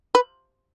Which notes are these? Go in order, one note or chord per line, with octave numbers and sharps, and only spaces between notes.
B4